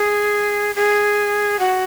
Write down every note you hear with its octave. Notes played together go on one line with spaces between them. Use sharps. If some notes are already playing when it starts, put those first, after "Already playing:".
Already playing: G#4
G#4
F#4